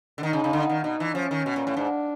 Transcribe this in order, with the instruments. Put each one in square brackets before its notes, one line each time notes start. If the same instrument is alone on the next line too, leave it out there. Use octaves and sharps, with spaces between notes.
[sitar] D3
[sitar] D#3 [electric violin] D#4
[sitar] C#3
C#3
D3
D#3
[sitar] B2 [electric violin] D#4
[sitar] E3
[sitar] F3 [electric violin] C#4
[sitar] D#3
B2
A#2
A2
[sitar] G#2 [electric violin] D4